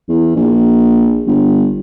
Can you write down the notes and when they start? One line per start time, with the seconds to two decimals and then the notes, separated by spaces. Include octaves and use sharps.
0.08 E2
0.36 A#1
1.27 G1